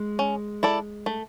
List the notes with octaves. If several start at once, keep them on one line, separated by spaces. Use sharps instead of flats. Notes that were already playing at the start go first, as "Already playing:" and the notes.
Already playing: G#3
C#4
E4 A4 D5
A3